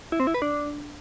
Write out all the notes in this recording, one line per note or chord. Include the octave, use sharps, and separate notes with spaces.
E4
C4
E4
B4
D4